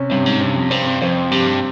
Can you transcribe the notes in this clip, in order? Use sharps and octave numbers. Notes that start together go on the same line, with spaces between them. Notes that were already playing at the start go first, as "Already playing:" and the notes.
Already playing: C3 C#4
G2 C3
G#2
G2 C3
F2
G2 C4
F2 C4
G2 G4